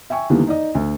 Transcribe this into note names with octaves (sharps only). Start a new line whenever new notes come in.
E5 G5 G#5 C#6
E2 D3 D#3 G3 A#3 B3
D#4 D5 D#5
D2